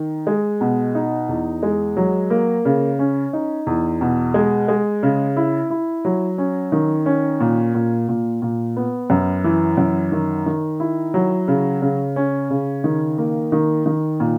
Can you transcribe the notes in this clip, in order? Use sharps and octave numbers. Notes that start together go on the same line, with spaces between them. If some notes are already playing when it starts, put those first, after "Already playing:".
Already playing: D#3
G#3
B2
D#4
E2
G#3
F#3
A#3
C#3
C#4
D#4
E2
B2
G#3
G#3
C#3
E4
E4
F#3
C#4
D#3
C#4
A#2
A#2
A#2
A#2
B3
F#2
E3
F#2
D#3
D#3
E4
F#3
C#3
C#3
C#4
C#3
D#3
A#3
D#3
D#3
A#2